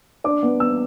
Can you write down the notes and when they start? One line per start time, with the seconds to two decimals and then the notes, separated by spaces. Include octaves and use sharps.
0.24 D4 D6
0.43 B3
0.60 B3 E6